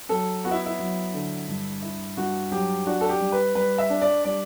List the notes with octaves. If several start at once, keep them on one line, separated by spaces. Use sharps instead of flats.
F#3 A4
B3 F#4
E4
E4
F#3
D3
G2
E4
G2 F#4
F#3 G4
D4 F#4
A4
G4
G3
B4
G3 B4
E5
D4
D5
G3 D5